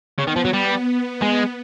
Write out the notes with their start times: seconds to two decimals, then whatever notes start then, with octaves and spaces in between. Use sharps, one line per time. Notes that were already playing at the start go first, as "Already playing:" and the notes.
0.19 C#3 B3
0.28 D#3
0.36 F3
0.45 F#3
0.53 G3 B3
1.22 G#3